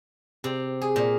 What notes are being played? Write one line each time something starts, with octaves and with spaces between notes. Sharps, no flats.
C3
G#4
A#2